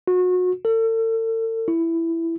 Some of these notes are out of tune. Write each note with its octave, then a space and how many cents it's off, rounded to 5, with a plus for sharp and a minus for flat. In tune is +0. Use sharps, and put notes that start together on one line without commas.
F#4 -30
A4 +40
E4 +10